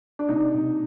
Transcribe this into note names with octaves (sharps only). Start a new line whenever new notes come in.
D4
C3 D#4
C3